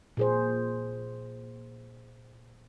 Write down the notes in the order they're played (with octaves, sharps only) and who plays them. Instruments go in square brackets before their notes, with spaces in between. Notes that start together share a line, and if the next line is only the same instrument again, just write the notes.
[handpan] A#2 G#4 C5